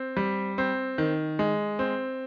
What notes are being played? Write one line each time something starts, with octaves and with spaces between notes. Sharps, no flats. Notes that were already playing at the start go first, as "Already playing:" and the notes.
Already playing: C4
G3
C4
D#3
G#3
C4